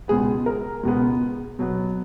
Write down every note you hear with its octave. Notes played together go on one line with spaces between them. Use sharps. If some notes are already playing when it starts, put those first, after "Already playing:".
C#2 B2 G#3 B3 G#4
A#4
C#2 B2 G#3 B3
B2 F#3 B3